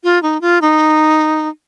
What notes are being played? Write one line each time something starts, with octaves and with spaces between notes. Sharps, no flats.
F4
D#4
F4
D#4